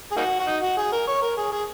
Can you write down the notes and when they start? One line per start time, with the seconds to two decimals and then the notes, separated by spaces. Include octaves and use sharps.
0.11 G#4
0.16 A#3 D#4 F#4
0.39 F#4
0.47 D#4
0.62 F#4
0.77 G#4
0.92 A#4
1.08 C#5
1.22 A#4
1.37 G#4
1.52 G#4